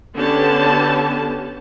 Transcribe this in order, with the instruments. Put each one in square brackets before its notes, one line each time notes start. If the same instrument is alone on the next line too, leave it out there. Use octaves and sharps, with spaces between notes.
[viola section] D3 B3 C#4 G4 A5